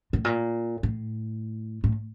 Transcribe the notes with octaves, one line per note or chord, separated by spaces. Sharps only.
A2
A#2
A2
A2